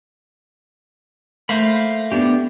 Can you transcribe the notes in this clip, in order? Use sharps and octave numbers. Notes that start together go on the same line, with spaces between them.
A3 A#3 C5 F5 B5
B3 D4 G4